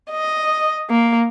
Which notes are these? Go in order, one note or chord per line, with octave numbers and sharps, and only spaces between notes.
D#5
A#3